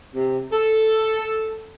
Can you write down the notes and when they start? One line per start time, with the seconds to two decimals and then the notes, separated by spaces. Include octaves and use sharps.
0.14 C3
0.53 A4